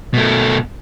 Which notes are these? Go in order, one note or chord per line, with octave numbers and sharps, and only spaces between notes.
B2 A3